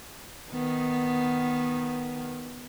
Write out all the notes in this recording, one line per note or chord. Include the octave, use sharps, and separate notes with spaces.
D#3 B3